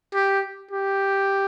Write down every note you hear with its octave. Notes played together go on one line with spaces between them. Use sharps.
G4
G4